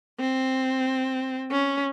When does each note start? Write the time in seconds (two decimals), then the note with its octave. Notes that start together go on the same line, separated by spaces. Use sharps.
0.20 C4
1.51 C#4